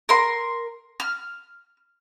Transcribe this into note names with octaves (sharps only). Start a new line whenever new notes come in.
A#4 C6
F6